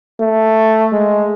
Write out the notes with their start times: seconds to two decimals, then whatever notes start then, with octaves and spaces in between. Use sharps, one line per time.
0.20 A3
0.92 G#3